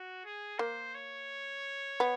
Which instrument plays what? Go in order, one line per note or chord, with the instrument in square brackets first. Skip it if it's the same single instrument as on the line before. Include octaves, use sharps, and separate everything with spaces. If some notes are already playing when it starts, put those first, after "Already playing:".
Already playing: [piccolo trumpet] F#4
G#4
[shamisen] A#3 [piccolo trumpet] C5
[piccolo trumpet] C#5
[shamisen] B3